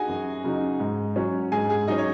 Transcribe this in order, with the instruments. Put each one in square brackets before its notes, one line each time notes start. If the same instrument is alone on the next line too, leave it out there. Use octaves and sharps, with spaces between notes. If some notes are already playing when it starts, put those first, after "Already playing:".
Already playing: [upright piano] D#4 F#4 G#4 G#5
[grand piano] F#2
C#3 F#3 D#4
G#2
F#3 C#4
[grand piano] G#2 [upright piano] G#4 G#5
[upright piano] G#4 G#5
[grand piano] F#3 C#4 [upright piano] D#4 D#5
[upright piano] C#5